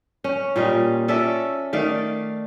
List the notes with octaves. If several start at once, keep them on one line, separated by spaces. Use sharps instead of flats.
C#4
A#2 G3 D#5 F5
C#4 A4 D5 E5
D#3 A3 D5 F5